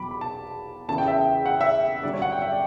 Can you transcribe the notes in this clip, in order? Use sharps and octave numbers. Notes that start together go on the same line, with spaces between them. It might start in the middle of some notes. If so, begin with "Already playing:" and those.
Already playing: E2 B2 F#3 B5 D6
B5
A5
E2 C#3 E3 A5
G5
E5
F#5
E5
G2 D3 F#3 D5
C#5
F#5
G5
E5
D5